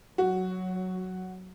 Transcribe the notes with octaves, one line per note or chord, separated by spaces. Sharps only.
F#3 F#4